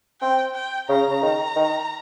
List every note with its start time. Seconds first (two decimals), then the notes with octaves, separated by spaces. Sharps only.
0.21 C4 G5
0.54 G5
0.88 C#3 A#5
1.10 C#3
1.22 D#3
1.56 D#3